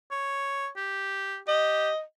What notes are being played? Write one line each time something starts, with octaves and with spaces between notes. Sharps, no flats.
C#5
G4
G4 D#5